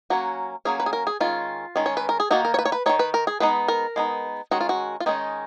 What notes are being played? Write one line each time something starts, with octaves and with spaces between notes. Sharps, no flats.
F#3 A#3 C#4 F#4
F#3 A#3 C#4 G#4
B4
G#4
A#4
G#4
D#3 G#3 C#4 F4
D#3 G#3 C#4
C#5
B4
A#4
G#4
D#3 A#3 D#4 F#4
A#4
C#5
B4
C#5
B4
D#3 A#3 D#4 C#5
B4
A#4
G#4
G#3 B3 D#4 B4
A#4
G#3 B3 D#4
D#3 G#3 C#4 F#4
F4
F#4
F4
D#3 G#3 C#4 D#4